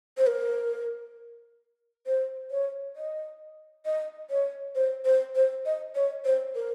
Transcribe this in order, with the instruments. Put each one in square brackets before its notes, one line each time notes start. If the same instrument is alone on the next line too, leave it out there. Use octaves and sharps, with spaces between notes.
[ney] C5
A#4
C5
C#5
D#5
D#5
C#5
C5
C5
C5
D#5
C#5
C5
A#4